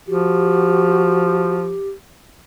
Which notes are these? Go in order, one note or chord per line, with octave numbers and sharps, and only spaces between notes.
F3 F#4 G4